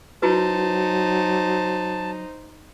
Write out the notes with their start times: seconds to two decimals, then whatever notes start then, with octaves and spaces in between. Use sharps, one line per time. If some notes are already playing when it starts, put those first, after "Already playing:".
0.22 F#3 D#4 E4 F#4 B4 C5 A5